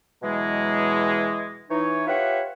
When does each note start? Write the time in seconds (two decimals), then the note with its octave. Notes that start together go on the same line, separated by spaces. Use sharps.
0.22 B2 E3 F#3 G#3
1.70 E3 D#4 C#5
2.07 F4 G4 B4 C#5 E5 F#5